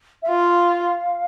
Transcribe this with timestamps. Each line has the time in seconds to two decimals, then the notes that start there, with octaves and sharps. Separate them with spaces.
0.23 E5
0.28 F4 F5